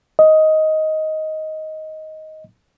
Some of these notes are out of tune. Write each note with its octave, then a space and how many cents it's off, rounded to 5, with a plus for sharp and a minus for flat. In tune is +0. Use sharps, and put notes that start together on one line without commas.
D#5 +10